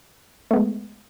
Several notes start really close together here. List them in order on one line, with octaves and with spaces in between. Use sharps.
A3 B3 G#3